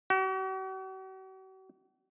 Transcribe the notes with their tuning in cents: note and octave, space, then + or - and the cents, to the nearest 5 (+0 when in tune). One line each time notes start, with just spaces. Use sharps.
F#4 +45